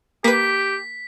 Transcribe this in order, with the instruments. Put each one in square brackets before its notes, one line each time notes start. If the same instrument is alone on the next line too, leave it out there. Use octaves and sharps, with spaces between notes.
[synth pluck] A#3 B4 [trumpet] G4 [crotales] B6